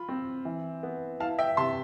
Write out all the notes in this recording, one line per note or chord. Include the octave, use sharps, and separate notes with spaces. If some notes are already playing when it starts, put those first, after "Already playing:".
Already playing: F4 B5
C4
E3
B3
E4 F5 A5
E5 G5
C3 A5 C6